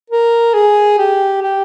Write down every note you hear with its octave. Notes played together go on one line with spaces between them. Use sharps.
A#4
G#4
G4
G4